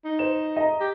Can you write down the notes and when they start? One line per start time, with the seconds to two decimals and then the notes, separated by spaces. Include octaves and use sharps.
0.05 D#4
0.19 C5 E7
0.57 D#5 A#5
0.80 G4